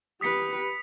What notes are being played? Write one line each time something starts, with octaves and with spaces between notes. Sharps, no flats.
G4 B4 D#6 B6 C#7